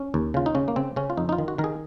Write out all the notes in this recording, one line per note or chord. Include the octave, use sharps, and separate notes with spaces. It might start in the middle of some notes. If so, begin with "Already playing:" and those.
Already playing: C#4
D#2
C#3 F4
D#4
C#3 C#4
A#3
C#3 C4
C#3 C#4
F4
F2 D#4
D#4
F4
D#3
F#4
D#3 A#4
G#4